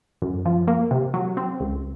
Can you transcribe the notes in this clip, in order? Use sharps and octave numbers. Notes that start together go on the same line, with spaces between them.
F#2
F3
A#3
C3
F#3
C4
C#2